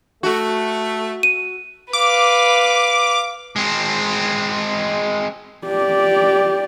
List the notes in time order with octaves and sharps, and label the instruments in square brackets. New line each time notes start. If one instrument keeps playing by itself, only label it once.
[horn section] A3 [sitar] F#4
[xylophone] D#7
[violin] B4 F5 [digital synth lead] D6
[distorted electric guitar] G#3 C4
[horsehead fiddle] G4 D5